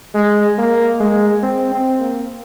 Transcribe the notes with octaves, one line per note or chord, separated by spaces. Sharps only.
G#3
A#3
G#3
C4
C4
A#3